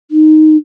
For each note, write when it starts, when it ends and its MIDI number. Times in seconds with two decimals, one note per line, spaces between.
0.11 0.56 63